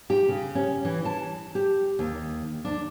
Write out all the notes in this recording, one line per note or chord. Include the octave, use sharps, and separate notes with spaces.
G4
C#3
C#4
E3
A5
G4
D#2
D4